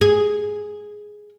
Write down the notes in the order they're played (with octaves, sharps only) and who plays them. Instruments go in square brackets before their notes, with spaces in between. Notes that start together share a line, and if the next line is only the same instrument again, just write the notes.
[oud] G#4